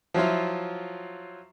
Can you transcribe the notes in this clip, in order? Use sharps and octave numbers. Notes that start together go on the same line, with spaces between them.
F3 F#3 E4 F4